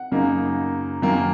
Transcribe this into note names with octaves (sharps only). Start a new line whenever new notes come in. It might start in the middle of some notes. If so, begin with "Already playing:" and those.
Already playing: F#5
F#2 C#3 A#3 D#4
F#2 D#3 F#3 A#3